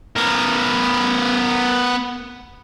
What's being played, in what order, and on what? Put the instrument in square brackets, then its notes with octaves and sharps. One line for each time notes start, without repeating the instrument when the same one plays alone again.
[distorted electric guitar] B3 A#4